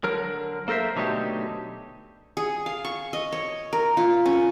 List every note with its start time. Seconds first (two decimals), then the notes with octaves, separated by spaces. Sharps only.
0.04 D3 F#3 A#4
0.68 A#3 A4 A#4 C5 E5
0.96 B2 D3 F#3 A3 D#4 G4
2.37 G#4
2.66 F5
2.85 C#6
3.13 D#5
3.32 C#5
3.73 A#4
3.97 F4
4.26 C#4